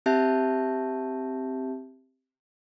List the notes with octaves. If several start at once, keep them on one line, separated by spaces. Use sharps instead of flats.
C4 G4 E5 A5 G6